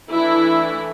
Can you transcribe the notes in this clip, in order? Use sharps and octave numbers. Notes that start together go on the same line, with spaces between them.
E3 A3 D4 E4